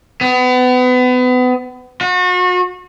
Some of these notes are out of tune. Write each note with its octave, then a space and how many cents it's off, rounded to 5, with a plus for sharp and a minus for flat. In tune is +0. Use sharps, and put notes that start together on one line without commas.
B3 +30
F#4 -35